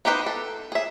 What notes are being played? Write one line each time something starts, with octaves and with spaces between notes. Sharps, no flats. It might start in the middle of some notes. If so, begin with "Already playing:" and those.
B3 D#4 G4 B4 C5
A4
G#4 E5